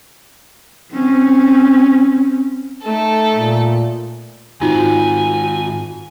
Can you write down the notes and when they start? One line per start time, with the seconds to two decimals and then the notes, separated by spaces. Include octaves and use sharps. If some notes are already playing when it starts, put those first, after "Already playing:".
0.92 C4 C#4
2.85 A3 D#4 A4
3.33 A#2
4.61 G#2 D#3 D#4 F4 F#4 G#5